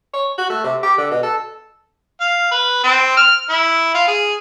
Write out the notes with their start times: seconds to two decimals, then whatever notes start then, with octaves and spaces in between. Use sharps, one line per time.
0.14 C#5
0.38 F#4
0.50 A3
0.64 C3
0.83 G4
0.98 D3
1.11 B2
1.23 A4
2.21 F5
2.52 B4
2.84 C4
3.17 F6
3.50 E4
3.94 F4
4.08 G#4